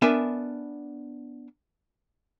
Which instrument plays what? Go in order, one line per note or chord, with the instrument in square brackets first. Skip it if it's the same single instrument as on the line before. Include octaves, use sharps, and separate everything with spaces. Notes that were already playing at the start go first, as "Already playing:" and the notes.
[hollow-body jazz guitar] B3 D4 A#4 E5 G#5